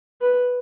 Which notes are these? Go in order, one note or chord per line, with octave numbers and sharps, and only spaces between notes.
B4